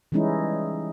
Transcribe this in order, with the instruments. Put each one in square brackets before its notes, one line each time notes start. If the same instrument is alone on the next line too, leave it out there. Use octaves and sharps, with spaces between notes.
[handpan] E3 G3 G#3 C#4 D#4 E4